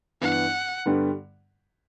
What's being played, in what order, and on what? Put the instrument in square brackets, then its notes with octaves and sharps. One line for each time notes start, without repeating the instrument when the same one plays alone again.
[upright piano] G2 E3 B3 [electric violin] F#5
[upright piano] G2 D3 G3 B3